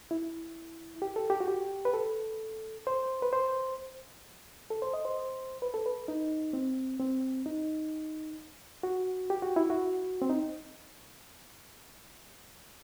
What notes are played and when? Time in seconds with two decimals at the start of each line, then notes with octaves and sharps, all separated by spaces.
0.11 E4
1.02 G4
1.16 A4
1.30 G4
1.41 F#4
1.48 G4
1.85 B4
1.94 A4
2.87 C5
3.22 B4
3.33 C5
4.70 A4
4.82 C5
4.94 D#5
5.05 C5
5.62 B4
5.74 A4
5.86 B4
6.08 D#4
6.53 C4
7.00 C4
7.46 D#4
8.83 F#4
9.30 G4
9.42 F#4
9.56 E4
9.70 F#4
10.22 C4
10.30 D#4